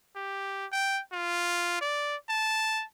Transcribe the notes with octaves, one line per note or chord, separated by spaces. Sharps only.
G4
G5
F4
D5
A5